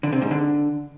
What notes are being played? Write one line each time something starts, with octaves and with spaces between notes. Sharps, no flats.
D3
C3
G#2
D3